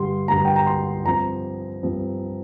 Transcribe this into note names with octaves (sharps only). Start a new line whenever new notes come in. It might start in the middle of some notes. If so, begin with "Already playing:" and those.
Already playing: G2 D3 G3 C6
G2 D3 G3 A#5
G5
A#5
C6
G2 F3 C4 A#5
G2 F3 C4